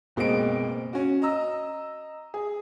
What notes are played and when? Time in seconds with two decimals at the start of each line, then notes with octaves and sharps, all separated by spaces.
0.16 F#1 B2 G#3 A#3 C4 D7
0.93 C#4 F#4
1.22 D#5 A#5 E6
2.34 G#4